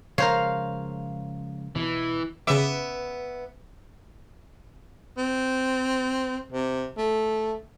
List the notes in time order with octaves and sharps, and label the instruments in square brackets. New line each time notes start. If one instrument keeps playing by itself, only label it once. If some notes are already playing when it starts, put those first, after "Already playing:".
[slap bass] C#3 F3 G#3 [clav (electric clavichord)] A#4 C5 C#5 [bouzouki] F5
[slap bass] B2 [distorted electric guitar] E3
[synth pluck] C#3 D6 [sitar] B3 E5
[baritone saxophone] C4
C3
A3